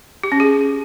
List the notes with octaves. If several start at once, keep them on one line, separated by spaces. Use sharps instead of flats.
G4
C#4
G#4